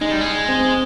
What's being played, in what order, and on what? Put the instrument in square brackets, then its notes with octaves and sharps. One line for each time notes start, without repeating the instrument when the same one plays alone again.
[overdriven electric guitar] G#3 [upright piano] D#4
[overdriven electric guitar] G3
G#3
[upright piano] C4